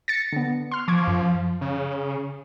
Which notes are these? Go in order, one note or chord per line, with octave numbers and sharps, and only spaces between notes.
A6 A#6 C#7
D3 B3
C6 F6
F3 C#6 D6 G#6
F#2
C#3